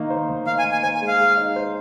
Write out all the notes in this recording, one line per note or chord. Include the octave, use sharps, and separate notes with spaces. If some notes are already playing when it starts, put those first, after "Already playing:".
Already playing: D#3 A#3 D#4
C5
D#3
D#4 F5
G#5
A#3
G#5
C5 G#5
G#5
G#3
F5
G#4
D#4
C5